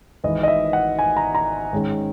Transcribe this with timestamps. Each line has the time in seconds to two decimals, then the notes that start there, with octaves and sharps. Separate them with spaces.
0.24 G#1 G#2 E3 D#5
0.43 D#5
0.48 E5
0.73 F#5
0.99 G#5
1.17 A#5
1.35 A#5
1.73 G#2 D#3 G#3 C#4